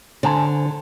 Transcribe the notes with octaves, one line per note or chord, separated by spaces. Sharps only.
D3 C5 G#5 A5